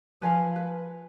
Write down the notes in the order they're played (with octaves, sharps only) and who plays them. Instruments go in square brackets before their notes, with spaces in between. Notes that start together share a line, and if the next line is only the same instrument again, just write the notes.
[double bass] F3 [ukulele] B4 F5 G#5
[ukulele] B4